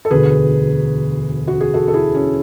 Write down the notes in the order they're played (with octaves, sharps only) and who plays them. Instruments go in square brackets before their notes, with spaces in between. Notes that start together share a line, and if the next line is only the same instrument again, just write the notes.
[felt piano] A4
E1 D2 D3 G#4 B4
F#4
G#4
F#4 A4
A4
E4 G#4
C#4